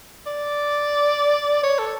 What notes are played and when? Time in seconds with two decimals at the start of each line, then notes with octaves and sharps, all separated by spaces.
0.26 D5
1.63 C#5
1.79 A4